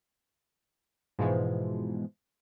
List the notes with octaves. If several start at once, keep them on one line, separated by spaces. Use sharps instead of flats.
G#2 B2 E3 F3 G#3